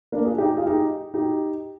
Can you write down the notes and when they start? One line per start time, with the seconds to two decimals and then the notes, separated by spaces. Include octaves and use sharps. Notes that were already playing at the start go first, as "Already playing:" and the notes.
0.12 A#3 D4
0.25 F4 G#4
0.38 D#4 G4
0.57 F4 G#4
0.66 D#4 G4
1.14 D#4 G4